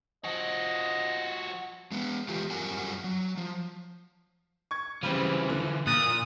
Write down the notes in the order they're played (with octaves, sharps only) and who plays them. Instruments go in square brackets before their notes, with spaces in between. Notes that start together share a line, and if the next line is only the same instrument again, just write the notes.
[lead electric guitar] F3 F#4 [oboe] D#5
[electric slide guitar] G#3 B3
E3 G#3 A3 F4 G4
F#2 F3 G3 A#4 F#5 G#5
F#3
F3
[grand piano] C#6 G#6
[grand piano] C#3 G3 C4 [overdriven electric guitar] E3 F3
[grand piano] D3
[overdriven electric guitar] A#2 [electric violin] D#6 [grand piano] F#6 A6